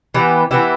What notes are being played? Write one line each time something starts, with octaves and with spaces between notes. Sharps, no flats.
E3 B3 E4 G4
E3 B3 E4 G4